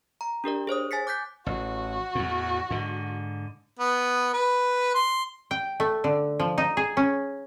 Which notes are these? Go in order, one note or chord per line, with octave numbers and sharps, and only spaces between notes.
A#5
D4 G4 A#4 D5
G#4 C5 C#5 D#6
G#5 A6 B6 C#7
D6 F#6 G6 B6
A1 F#4
E2 A2
G#2 D3
B3
B4
C6
G5
A3
D3
F3
D#4
G#4
C#4